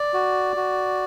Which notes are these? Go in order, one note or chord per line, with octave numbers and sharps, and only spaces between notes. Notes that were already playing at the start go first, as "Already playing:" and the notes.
Already playing: D5
F#4
F#4